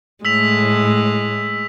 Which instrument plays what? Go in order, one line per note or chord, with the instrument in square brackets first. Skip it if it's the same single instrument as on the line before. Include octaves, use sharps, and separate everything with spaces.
[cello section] A2 [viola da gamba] G#3 [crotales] E6 B6 F7